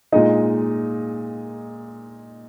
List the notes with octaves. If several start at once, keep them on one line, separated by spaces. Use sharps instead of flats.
A#2 G#3 D#4 D#5